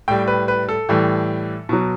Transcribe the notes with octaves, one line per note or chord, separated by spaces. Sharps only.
A2 G3 G5
B4
B4
A4
A2 E3 G3
B2 F#3